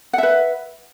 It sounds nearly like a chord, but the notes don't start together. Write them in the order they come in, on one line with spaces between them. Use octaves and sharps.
F#5 E5 B4